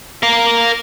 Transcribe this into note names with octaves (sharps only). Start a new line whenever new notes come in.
A#4 F5